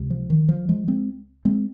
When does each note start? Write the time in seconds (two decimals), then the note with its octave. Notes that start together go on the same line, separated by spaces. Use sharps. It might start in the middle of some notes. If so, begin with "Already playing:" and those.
Already playing: C#2 C3
0.10 F3
0.30 D#3
0.49 F3
0.69 F3 G#3
0.88 G#3 C4
1.45 G#3 C4